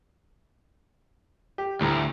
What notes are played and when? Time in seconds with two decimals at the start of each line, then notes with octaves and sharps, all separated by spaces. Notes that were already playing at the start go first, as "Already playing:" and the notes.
1.58 G4
1.81 D2 A2 G3 A#5